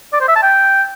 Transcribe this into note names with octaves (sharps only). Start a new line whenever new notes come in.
D5
C5
E5
A5
G5